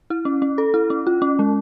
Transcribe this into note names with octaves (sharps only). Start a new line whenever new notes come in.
E4
C#4
C#4
A4
E4
C#4
F4
C#4
G#3